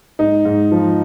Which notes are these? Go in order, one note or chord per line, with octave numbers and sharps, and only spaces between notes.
G#2 D#4
G#2
F3